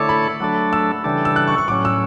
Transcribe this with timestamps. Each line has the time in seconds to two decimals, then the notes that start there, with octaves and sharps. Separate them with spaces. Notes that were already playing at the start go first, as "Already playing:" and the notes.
Already playing: D3 A3 E4 A4 C#5 D6
0.09 B5
0.40 F#3 A3 D4 A4
0.73 E6
1.04 C#3 E3 G3 D4 A4
1.25 E6
1.36 F#6
1.48 C#6
1.58 C#6
1.68 A2 F#3 C#4 D6
1.85 E6